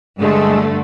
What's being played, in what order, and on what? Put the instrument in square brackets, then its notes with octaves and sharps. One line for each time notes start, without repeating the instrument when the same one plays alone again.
[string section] G2 D3 A3 [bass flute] G#3